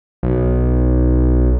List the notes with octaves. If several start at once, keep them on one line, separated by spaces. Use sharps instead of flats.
B1